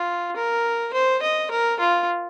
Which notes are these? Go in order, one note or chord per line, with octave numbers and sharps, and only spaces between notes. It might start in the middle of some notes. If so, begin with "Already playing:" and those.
Already playing: F4
A#4
C5
D#5
A#4
F4